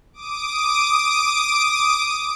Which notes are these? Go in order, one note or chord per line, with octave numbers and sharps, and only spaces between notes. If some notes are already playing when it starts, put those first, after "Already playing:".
D6 D#6 D7